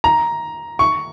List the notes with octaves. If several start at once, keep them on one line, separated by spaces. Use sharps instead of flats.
A#5
C#6